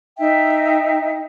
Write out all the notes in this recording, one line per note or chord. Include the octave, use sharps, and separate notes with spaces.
D#4 E5 G5